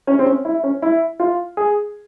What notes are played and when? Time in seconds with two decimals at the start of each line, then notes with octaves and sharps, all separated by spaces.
0.07 C#4
0.19 C4
0.26 C#4
0.45 E4
0.63 C#4
0.82 E4
1.20 F4
1.57 G#4